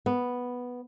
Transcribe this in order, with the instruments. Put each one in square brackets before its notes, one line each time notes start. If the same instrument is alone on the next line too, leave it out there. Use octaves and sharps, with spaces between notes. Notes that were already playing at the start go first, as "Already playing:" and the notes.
[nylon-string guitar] B3